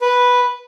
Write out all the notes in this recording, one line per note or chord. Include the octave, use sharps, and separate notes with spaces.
B4